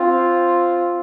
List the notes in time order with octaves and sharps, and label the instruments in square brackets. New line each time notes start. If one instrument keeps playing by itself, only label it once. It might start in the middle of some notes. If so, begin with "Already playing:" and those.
Already playing: [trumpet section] C4 F4